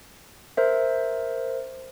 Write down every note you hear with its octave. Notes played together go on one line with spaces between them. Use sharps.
A#4 C5 E5